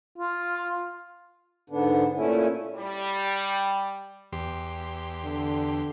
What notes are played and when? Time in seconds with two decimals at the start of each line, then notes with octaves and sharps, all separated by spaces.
0.18 F4
1.70 G#2 D3 B3 D4
2.15 A#2 A3 C#4 E4
2.75 G3
4.32 E2 G4 C6
5.24 D3